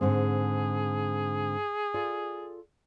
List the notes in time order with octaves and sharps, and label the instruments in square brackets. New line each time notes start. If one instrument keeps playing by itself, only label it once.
[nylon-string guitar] G#2 D3 C4 [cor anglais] G#4
[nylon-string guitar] F4 A4 D5